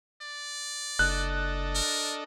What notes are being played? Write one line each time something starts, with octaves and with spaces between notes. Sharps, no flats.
D5
F#1 D4 A4 D#5 F#6
A#4